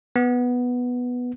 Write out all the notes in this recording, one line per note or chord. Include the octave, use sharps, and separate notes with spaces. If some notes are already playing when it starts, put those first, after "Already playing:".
B3